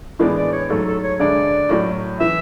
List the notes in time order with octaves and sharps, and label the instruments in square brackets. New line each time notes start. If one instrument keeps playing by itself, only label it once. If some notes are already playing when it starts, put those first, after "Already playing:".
[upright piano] A2 E3 G#3 B3 D4 [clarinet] D5
[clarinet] D5
C#5
[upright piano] G#2 F#3 A3 C#4 [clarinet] A4
[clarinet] A4
C#5
[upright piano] D2 D3 G#3 D4 [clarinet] D5
[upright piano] A2 F#3 A3 C#4 F#4
[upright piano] E3 [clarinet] E5